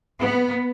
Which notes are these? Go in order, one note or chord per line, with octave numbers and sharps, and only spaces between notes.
B3